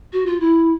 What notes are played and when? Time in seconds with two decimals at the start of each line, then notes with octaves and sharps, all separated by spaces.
0.13 F#4
0.26 F4
0.40 E4